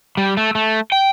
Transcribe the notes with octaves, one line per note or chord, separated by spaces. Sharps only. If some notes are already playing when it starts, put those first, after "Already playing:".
G3
A3
A3
G5